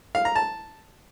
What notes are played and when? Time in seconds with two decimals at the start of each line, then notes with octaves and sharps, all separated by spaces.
0.15 F5
0.25 A#5
0.36 A5